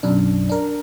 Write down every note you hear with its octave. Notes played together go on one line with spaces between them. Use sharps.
B1 F#2 D4
D4 A#4